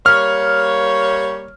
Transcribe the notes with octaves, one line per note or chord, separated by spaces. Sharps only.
G3 A#3 C#5 F6